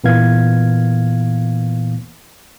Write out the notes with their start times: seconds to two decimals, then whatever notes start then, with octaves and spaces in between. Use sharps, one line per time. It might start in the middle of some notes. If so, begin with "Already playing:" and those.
0.04 A#2 E3 A#3 B3 F5 G#6